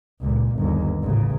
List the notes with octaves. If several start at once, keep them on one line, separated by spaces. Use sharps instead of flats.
C#2 A#2
G1 D#2
A1 C#3